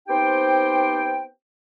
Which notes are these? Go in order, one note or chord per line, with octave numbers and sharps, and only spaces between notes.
B3 C4 D#4 G4 C5 G5